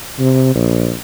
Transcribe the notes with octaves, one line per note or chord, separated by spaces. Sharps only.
C3
A#1